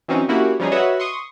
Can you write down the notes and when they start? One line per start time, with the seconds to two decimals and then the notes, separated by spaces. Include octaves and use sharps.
0.09 E3 F#3 C4 C#4 D#4
0.29 A#3 C#4 E4 F#4 G4
0.60 F3 G3 C#4 D#4 G#4
0.72 F#4 B4 C#5 D#5 E5 F#5
1.00 C6 C#6 D#6